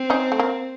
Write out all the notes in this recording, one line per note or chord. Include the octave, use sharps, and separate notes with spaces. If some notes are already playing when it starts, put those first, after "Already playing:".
Already playing: C4
C#4 D#4
A3
A#3